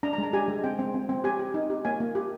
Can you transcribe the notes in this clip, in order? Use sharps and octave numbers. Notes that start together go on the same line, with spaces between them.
D4 A#5
A#5
G#3
A#5
G4 G#5
G#3
C4 G5
C4
C4
C4
G4 G#5
G4
D#4
G4
A#3 G#5
A#3
G4